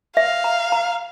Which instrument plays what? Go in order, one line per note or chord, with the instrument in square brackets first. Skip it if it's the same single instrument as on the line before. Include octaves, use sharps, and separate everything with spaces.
[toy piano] E5 [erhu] F5
[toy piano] A#5
A#5